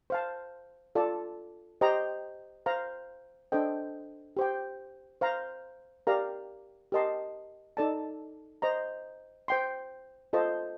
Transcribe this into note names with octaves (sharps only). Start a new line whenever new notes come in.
C5 F5 A5
F4 A4 D5 A5
G4 C5 D#5 G5 A#5
C5 F5 A#5
D4 A4 C5 D#5 G5
G4 C5 G5
C5 F5 A#5
G4 A#4 D5 F5 A#5
G4 A#4 D#5 A5 C6
D#4 A4 D5 A5
C5 D#5 A#5
C5 G5 C6
F4 A4 C5 D#5 A5